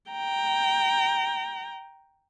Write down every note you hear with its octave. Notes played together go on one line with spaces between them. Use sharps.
G5 A#5